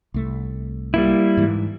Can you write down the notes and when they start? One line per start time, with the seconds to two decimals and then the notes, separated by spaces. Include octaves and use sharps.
0.14 C2 A3
0.94 G3 A#3 E4
1.37 G#2 E3